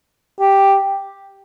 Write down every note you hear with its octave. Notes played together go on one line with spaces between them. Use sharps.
G4